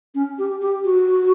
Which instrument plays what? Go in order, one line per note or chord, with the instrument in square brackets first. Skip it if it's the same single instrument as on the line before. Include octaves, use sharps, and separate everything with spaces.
[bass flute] C#4
G4
G4
F#4